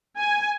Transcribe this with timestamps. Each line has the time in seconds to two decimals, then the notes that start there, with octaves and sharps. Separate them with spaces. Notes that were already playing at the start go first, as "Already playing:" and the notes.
0.18 G#5